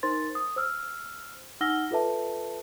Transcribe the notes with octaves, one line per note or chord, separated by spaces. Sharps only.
D#4 A#4 C5 C6 A6
D#6
C5 E6 F6
D#4 F#5 E6 F6 A#6 G7
F4 A4 B4 E5 A5